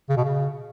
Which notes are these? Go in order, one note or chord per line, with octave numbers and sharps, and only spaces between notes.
C#3
B2
C#3